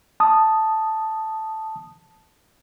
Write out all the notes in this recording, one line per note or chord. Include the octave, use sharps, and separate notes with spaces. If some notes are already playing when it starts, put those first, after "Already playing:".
A5 D#6